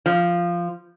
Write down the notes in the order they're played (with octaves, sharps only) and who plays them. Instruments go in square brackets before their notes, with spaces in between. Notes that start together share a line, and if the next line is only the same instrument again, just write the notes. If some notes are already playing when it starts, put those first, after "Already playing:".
[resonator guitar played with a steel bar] F3